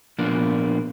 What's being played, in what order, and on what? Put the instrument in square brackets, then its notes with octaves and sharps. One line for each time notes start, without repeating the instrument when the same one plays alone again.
[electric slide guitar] A#2 F3 A#3 B3 D4